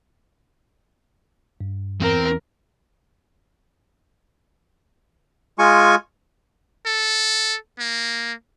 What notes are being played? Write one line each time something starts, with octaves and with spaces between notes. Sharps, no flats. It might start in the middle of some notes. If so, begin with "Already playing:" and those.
G2
E2 E3 C4 A#4
G#3 F4 G#5 C#6
A4
A#3